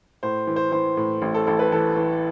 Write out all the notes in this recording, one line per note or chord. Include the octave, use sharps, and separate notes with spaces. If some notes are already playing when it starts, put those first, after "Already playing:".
A2 C5
E3
C5
E3 C5
A2
A1
A4
A1 A4
B4
E3 A4
E3